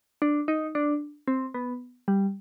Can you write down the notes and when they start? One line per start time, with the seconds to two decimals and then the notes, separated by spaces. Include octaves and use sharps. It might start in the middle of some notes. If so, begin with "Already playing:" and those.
0.22 D4
0.48 D#4
0.75 D4
1.28 C4
1.54 B3
2.08 G3